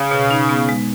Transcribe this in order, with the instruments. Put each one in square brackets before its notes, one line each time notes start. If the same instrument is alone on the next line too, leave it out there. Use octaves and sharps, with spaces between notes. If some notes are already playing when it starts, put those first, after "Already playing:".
Already playing: [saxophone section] C#3
[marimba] B2
D#4
B3
G#3